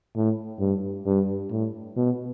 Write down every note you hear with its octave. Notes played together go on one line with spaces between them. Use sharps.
A2
G2
G2
A2
B2